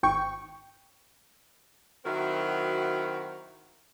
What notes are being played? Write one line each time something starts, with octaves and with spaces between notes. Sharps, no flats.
G#1 G5 C#6
D#3 F#3 C4 E4 F#4 A#4